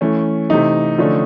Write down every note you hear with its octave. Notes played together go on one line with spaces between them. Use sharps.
E3 A3 C#4
C3 E3 A3 D#4
D3 F3 A3 C#4